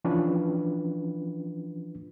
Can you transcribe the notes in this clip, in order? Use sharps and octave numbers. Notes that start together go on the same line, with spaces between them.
E3 F3 C#4 D4 F4 B4